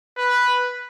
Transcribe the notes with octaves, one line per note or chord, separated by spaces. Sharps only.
B4